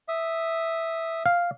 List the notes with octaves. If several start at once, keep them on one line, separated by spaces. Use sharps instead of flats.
E5 D#6
F5